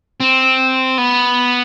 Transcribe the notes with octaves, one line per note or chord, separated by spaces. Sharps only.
C4
B3